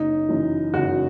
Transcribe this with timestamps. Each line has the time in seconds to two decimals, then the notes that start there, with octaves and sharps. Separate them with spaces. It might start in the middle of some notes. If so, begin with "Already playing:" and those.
Already playing: F#1 D#4
0.29 F#2 E3
0.74 F#1 F#4